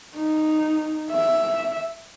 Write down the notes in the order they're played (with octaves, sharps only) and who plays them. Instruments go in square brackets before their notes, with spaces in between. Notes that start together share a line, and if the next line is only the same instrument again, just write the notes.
[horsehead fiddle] D#4
E5